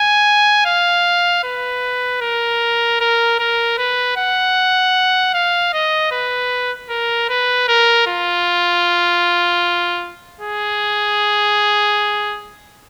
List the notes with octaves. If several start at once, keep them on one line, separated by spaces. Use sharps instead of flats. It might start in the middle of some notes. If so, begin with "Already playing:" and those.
Already playing: G#5
F5
B4
A#4
A#4
A#4
B4
F#5
F5
D#5
B4
A#4
B4
A#4
F4
G#4